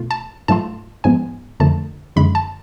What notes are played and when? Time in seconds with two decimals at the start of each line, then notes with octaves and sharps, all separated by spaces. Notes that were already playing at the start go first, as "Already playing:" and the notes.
Already playing: B2 A3 F4
0.11 A5
0.48 G#2 F#3 A3 F4 A5
1.04 G#2 F3 G#3 B3 G#5
1.60 F2 D3 F3 A3 A5
2.16 F#2 D3 F3 G#3 B5
2.35 A5